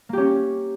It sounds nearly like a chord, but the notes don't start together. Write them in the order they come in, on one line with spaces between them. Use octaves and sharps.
A#3 G4 C#4